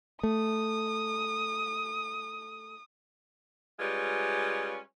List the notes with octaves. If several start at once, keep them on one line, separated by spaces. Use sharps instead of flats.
A3 D#6
G3 G#3 C#4 F4 B4